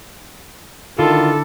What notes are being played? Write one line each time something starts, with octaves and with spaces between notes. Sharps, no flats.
D3 D#3 E4 F4 A4